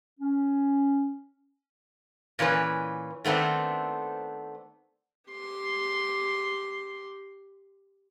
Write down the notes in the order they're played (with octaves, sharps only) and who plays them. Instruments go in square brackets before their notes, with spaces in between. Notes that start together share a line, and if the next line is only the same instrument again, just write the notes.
[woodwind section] C#4
[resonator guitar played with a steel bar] A#2 E3 C#4 B4
D#3 A3 B3 C4 D4
[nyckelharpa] G4 C6